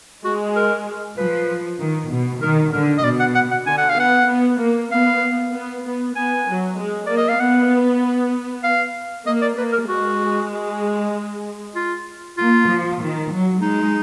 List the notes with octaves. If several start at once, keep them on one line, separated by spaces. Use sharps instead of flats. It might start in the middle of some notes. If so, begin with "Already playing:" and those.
G#3 F#4
A#4
F3 B4
D#3
B2
D#3 A#4
D3 A#4
D#5
B2 D5
F#5
F#5
F#5
D3 G#5
F#5
F5
B3 F#5
B3
A#3
B3 F5
B3
B3
B3 G#5
F#3
G#3
A#3 D5
D#5
F5
B3 F#5
F5
A#3 D#5
D5
A#3 B4
A#4
G#3 F#4
F4
A#3 F4
F3
D#3
F#3
G#3 D#4